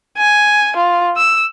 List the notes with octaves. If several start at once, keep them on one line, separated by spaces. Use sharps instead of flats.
G#5
F4
E6